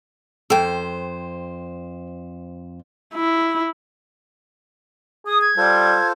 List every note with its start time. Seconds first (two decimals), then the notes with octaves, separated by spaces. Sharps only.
0.50 F2 A4 C5 G5
3.14 E4
5.26 G#4 D#6
5.41 G#6
5.57 G3 F4 A4 C5